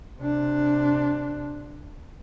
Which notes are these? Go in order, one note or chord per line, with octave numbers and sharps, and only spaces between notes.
C3 D4